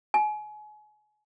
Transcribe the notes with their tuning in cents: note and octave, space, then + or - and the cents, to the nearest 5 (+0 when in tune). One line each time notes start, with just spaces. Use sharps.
G#5 +30